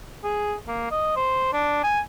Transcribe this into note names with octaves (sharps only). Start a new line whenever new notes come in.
G#4
A#3
D#5
C5
D4
G#5